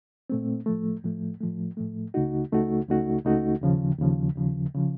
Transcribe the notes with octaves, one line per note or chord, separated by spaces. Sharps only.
A#2 A3 C4
A2 F3 A3
A2 F3 A3
A2 F3 A3
A2 F3 A3
C#2 C#3 A3 D#4 F#4
C#2 C#3 A3 D#4 F#4
C#2 C#3 A3 D#4 F#4
C#2 C#3 A3 D#4 F#4
D#2 C#3 F3
D#2 C#3 F3
D#2 C#3 F3
C#3 F3